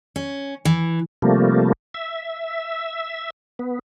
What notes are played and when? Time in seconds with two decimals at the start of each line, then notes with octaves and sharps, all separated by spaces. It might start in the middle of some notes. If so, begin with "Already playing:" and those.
0.16 C#4
0.65 E3
1.22 C3 F3 G3 A3 A#3
1.94 E5
3.59 B3